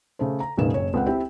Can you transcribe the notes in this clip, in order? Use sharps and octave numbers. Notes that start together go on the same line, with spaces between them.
C#3 A3 A4 C5
A#5
E1 A1 C#3 A#3 D#4 E7
F#1 C#5
C#2 C4 F#5
C4 E4 G4